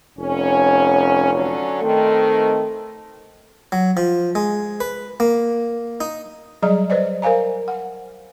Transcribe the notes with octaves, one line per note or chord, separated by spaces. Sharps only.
F1 C#4
D3 F#3 C#4
D#3 A3 C4
F#3
F3
G#3
B4
A#3
D#4
F#3 G3 G#4 D5 D#5 A#5
B4 C5 D5 D#5
A#4 C5 F5 G#5 A#5
F#5